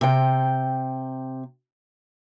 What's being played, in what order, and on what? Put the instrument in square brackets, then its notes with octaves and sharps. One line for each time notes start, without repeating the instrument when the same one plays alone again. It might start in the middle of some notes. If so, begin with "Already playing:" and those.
[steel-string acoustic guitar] C3 G5